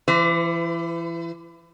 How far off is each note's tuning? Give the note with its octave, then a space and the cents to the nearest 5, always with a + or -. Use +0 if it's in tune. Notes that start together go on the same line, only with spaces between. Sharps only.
E3 +30 C5 -40